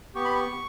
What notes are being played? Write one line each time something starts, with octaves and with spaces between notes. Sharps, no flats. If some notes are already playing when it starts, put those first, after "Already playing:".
B3 G4 C#6
B5
C#6